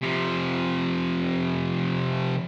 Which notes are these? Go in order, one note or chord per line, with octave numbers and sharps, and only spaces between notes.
C3 F3